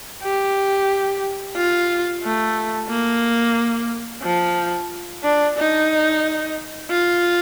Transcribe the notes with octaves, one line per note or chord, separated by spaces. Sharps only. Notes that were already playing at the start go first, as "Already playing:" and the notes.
G4
F4
A3
A#3
F3
D4
D#4
F4